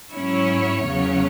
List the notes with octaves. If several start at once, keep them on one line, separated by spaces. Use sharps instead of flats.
G#2 F#3 C#4 E4 C#5
E2 C#3 F#3 C#4